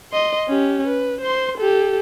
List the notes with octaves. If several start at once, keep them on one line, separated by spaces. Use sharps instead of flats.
D#5 C6
C#4 G4
B4
C5 C6
G4 A4